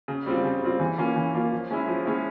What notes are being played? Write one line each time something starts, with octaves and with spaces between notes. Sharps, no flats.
C#3
G3 C4 F4
C#3
G3 C4 F4
E3
A#3 C#4 F4
E3
A#3 C#4 F4
F3
G#3 C#4 E4
F3
G#3 C#4 E4